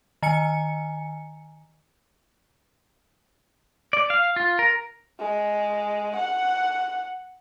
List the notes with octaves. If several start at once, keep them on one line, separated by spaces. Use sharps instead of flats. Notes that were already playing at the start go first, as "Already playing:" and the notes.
D#3 G#5 C#7
D5
F5
F4
A#4
G#3
F#5